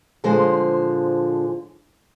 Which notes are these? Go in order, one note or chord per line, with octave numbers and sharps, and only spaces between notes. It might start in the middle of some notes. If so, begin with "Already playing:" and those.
A#2 D3 F3 G#3 C5 G#5